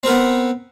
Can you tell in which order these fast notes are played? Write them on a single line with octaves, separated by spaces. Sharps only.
C4 A#4 B3